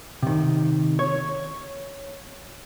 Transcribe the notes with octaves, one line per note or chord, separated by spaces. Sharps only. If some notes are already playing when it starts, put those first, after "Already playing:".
C3 D#3
C#5